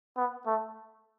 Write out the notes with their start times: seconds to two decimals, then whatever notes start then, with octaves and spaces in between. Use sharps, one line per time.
0.17 B3
0.47 A3